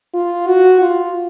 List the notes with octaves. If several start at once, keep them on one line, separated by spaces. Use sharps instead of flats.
F4
F#4
F4